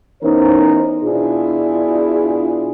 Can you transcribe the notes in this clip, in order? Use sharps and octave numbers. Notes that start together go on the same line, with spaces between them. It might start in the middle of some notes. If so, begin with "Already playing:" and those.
E3 B3 C#4 D#4 A#4 C5
B2 D4 E4 F4 G#4